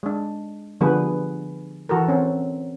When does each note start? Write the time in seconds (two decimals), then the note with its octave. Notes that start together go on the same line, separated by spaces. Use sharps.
0.03 G#3 D4
0.81 D3 F3 G3 B3 G#4 B4
1.89 E3 F#4 A4 A#4
2.08 C4 C#4